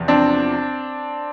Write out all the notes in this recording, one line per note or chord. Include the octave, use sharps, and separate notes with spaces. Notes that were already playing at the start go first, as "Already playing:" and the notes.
Already playing: E2 C3 F3
C4 D4